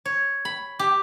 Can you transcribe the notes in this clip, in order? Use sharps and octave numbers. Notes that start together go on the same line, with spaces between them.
C#5
B5
G4